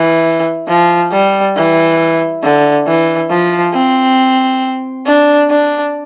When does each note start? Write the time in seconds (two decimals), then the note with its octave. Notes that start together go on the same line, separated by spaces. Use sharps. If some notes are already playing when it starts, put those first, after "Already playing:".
Already playing: E3
0.68 F3
1.12 G3
1.56 E3
2.43 D3
2.87 E3
3.30 F3
3.73 C4
5.06 D4
5.50 D4